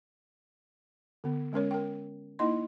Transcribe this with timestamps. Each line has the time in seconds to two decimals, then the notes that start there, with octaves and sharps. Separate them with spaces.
1.24 D3 B3
1.53 G#3 C#4 A#4 C#5
1.71 A#4 G5
2.39 A#3 D#4 E4 D#5 C6